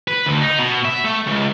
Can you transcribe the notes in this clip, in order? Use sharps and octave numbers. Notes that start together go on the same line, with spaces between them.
B4
D2
D#4
B2
E5
A3
C#2